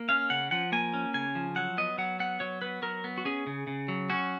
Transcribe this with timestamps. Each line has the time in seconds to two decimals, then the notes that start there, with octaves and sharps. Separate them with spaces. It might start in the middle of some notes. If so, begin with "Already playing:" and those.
Already playing: A#3
0.09 C#4 F5
0.30 C#3 F#5
0.51 F3 F#5
0.72 A#3 G#5
0.94 C#4
1.14 C#3 G#5
1.35 F3
1.56 F#3 F#5
1.78 B3 D#5
1.98 F#3 F#5
2.19 B3 F#5
2.40 F#3 C#5
2.62 B3 B4
2.82 F#3 A#4
3.04 B3
3.18 F#4
3.25 C#4 G#4
3.47 C#3
3.67 C#3
3.88 F#3
4.10 C#4 F#4